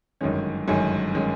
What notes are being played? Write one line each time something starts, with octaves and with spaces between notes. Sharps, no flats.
G1 F#2 D#3 G#3 C#4
G1 F#2 D#3 G#3 C#4
D#3 G#3 C#4